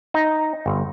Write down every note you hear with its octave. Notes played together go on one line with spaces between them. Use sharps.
D#4
G1